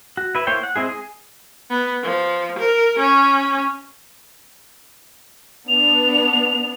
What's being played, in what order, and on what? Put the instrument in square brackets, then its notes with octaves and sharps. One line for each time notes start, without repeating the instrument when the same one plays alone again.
[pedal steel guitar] F#4
E4 B4 E5
A#3 E4 C5 C#5 G5
F#5
G#3 C4 E4 G#4
G#4
[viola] B3
F3
A#4
C#4
[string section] B3 D4 [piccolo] F7